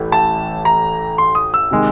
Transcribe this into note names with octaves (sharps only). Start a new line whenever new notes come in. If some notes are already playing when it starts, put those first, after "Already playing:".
Already playing: A1 A2 E3 A3
A5
A#5
C6
D#6
E6
C3 D#3 G#3